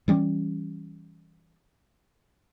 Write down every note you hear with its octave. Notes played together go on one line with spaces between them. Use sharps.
E3 G3 C#4